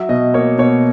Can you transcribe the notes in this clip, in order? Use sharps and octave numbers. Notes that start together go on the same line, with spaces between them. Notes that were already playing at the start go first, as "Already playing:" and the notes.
Already playing: F#3 E5
B2 D#5
A#3 C#5
B2 C#5